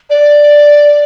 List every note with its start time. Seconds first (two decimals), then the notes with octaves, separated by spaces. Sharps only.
0.10 D5